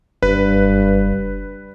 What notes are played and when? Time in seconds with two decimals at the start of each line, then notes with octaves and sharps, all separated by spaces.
0.23 F#1 G2 B4